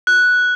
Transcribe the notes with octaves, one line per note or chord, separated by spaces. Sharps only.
F#6